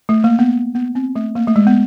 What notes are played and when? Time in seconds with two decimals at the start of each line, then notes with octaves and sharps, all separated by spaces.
0.09 A3
0.24 A#3
0.39 B3
0.75 B3
0.95 C4
1.16 A3
1.35 A#3
1.48 A3
1.56 G#3
1.67 B3